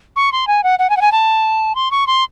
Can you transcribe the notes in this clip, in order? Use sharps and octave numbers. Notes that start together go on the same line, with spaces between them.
C#6
C6
G#5
F#5
F#5
G#5
F#5
G#5
A5
C6
C#6
C6